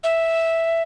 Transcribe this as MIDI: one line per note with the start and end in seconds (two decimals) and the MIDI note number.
0.04 0.83 76